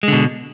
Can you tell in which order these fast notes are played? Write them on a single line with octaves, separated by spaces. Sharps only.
G#3 D3 B2